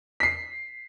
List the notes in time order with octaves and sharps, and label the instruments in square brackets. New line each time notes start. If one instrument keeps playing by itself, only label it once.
[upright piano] B6 C7